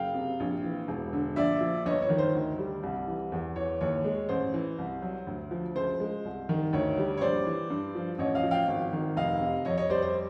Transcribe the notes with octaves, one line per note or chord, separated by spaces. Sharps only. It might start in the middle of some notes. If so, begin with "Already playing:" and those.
Already playing: F#1 F5 G5
C3
A#1
E3
E1
D3
A#1 D5 E5
F3
G1 C#5 D#5
C#5
D#3
C5
D2
G3
C2
E3
E2
E3 C#5
D#2 C#5
G#3
A1 C5
E3
C2
F#3
D2
F3
C#2 C5
G#3
C2
D#3
D2 C#5
G3
C#5
A#1 C5 D5
E3
G2
F3
A1 C#5 D#5
D#5 F5
F3
F5 G5
G#1
D#3
F1 D#5 F5
C3
F2 C#5 D#5
C#5 D#5
G3 C5 D5
C5